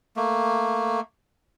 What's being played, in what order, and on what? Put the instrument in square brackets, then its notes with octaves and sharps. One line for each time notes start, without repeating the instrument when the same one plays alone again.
[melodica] A3 A#3